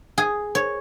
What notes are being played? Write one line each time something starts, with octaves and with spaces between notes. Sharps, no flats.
G#4
C#5